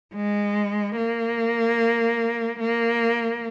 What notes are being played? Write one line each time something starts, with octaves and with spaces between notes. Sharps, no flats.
G#3
A#3
A#3